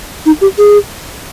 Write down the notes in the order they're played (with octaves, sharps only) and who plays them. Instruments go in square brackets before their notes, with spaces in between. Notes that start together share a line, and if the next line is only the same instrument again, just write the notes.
[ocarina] D#4
G4
G#4